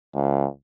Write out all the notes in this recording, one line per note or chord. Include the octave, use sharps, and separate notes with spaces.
C#2